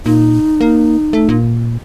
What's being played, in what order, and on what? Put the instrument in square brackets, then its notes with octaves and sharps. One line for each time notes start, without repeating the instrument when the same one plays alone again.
[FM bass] A#2 [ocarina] D#4
[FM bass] A#3
A3
A#2